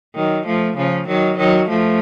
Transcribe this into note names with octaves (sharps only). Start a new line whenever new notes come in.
D#3 F#3
F3 A3
C#3 F3
D#3 F#3
D#3 F#3
F3 A3